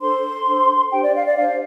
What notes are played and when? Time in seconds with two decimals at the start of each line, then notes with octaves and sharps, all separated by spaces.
0.01 D4 A4 C5 C6
0.46 D4 A4 C5
0.91 D4 G4 C5 G5
1.03 D5
1.14 F5
1.25 D5
1.36 D4 G4 C5 F5